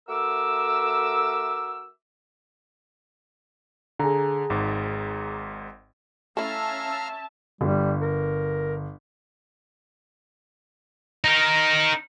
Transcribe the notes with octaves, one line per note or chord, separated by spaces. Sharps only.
A3 F#4 A#4 E5 D6 E6
D3 G#4 A#5
G#1 G#2
A3 C#4 E4 E5 F5 A5 A#5 F6
G1 G3
A#4
D#4 A#4